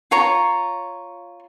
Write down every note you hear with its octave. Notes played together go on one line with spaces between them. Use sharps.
F4 C#5 A#5